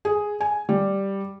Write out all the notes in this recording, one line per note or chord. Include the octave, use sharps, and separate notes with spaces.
G#4
G#5
G3